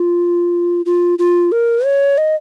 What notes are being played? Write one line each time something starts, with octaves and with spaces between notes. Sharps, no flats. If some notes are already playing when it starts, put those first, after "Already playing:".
Already playing: F4
F4
F4
A#4
C#5
D#5